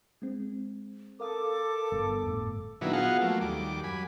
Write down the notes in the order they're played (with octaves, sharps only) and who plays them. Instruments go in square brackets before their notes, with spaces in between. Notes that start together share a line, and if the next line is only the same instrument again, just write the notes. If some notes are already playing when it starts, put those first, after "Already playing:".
[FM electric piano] G#3 C4
[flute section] A4 D6 [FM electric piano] A#4 F5 D#6
[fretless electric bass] G1
[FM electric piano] F2 A2
[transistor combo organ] A#2 D3 D#3 F#3 B3 E4
B3 F4 F#4 G#4 F5 F#5
F3 F#3 A3 A#3
D#2 G3 D6
F#2 G#5 B5